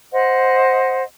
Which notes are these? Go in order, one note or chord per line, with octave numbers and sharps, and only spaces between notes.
C5 D#5 F#5